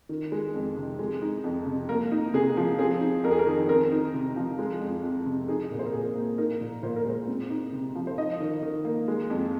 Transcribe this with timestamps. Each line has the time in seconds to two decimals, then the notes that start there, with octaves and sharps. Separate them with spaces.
0.09 D#3
0.32 G#3
0.54 F2
0.77 C3
0.99 G#3
1.22 D#4
1.44 F2
1.66 C3
1.89 A#3 A#4
2.12 D#4
2.34 C3 G#4
2.57 F3
2.79 C4 G#4
3.01 D#4
3.24 F2 A#4
3.31 G#4
3.39 A#4
3.47 D#3
3.68 C4 A#4
3.91 D#4
4.14 C3
4.36 F3
4.59 G#3
4.81 F2
5.03 F2
5.26 C3
5.48 D#4 G#4
5.71 A#2
5.79 C5
5.86 A#4
5.93 A#2 G#4
6.15 A#3
6.38 D#4 A#4
6.61 A#2
6.83 A#2 C5
6.96 A#4
7.06 G#3 C5
7.28 C4
7.50 D#4
7.73 C3
7.95 F3
8.07 C5
8.18 D#4 D#5
8.40 D#3
8.62 D#3
8.85 A#3
9.08 G#3
9.30 F2